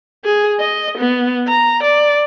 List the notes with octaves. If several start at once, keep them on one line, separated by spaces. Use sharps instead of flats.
G#4
D#5
B3
A#5
D5